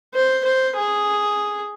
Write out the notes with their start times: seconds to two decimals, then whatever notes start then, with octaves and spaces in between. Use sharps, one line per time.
0.14 C5
0.45 C5
0.76 G#4